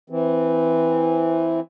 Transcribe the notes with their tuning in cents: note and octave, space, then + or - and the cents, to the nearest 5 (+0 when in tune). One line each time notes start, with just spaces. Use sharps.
E3 +0 C4 -15